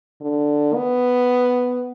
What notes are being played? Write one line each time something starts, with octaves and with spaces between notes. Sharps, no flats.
D3
B3